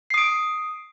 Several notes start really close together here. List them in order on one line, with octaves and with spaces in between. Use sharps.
C7 D#6 D7